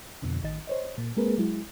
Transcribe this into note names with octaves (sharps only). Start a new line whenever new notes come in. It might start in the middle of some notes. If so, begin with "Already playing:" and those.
F2 B2 D3
A1 D#3 D#5 A6
C5 C#5 D#5
A#2
G#3 A#3 C4 G#4 A#4 B4
F#3 G#3 E4